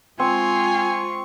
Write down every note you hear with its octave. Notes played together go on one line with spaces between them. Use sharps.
G#3 C4 F4 G#5 C#6